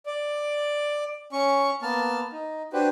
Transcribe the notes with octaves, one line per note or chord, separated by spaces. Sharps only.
D5
C#4 C#6
A#3 B3 A5 F6
D#4
D4 F#4 G4 B4 C5